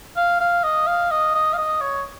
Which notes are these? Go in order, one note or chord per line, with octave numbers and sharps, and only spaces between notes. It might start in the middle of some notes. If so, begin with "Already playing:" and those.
F5
F5
D#5
F5
D#5
D#5
F5
D#5
C#5